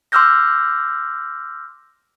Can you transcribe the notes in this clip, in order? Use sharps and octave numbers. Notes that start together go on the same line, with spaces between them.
C6 D6 E6 F6 G6 A#6